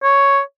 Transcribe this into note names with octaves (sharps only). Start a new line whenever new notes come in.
C#5